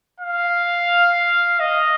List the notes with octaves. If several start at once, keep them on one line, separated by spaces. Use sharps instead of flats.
F5
D#5